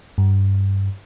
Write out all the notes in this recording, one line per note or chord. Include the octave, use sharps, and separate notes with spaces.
G2